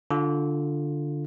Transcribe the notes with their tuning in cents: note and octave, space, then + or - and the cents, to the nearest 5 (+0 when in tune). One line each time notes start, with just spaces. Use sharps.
D3 +0 F4 +0